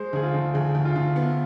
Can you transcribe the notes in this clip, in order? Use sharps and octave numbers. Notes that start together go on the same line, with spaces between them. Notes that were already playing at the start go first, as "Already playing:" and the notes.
Already playing: G#3 C5
D2 G#4
F4
D2
D2 G#4
D2
F4
D2
B3